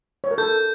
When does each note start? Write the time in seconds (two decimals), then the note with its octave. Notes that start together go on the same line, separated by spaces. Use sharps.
0.24 C#5
0.31 A#4
0.38 A4 G6